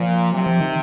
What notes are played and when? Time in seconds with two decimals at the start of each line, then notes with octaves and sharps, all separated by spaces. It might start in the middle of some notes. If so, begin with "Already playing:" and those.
Already playing: A#2 F3
0.32 C3 F#3
0.46 F3
0.61 D#3